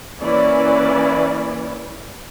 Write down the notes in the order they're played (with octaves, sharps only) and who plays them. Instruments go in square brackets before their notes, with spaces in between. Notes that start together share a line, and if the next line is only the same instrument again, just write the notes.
[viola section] E3 A#3 C#4 E4 B4 D5